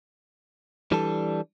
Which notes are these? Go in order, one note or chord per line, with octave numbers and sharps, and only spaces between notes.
E3 G3 D4 A4